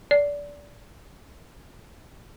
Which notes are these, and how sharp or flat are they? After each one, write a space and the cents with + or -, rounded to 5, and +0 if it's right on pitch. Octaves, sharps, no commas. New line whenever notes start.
D5 -20